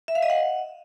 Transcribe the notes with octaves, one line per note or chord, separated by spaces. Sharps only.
E5
F5
D#5
F#5